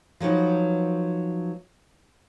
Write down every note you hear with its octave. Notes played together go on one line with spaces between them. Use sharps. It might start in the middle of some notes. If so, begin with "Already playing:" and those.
F3 F#3 B3 D#4